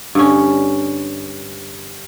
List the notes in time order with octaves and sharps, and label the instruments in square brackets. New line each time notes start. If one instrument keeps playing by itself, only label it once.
[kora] G2 D3 C#4